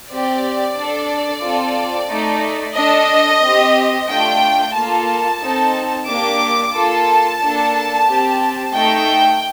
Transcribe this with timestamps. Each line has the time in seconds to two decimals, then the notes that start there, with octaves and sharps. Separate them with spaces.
0.10 C4 G4 D5
0.77 D4 A4
1.43 C4 F4 A4
2.10 A3 D#4 A4
2.76 D4 A4 D#5
3.43 C4 G4
4.09 A3 D4 F4 G5
4.75 A#3 F4 A4 A5
5.41 C4 D#4 A4
6.08 A#3 D4 G4 D6
6.75 A#3 F4 A4 A5
7.41 A#3 D4 A4
8.07 C4 G4
8.73 A3 D#4 A4 G5